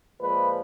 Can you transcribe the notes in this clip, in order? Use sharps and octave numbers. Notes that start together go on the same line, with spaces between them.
A#2 F3 G#3 B4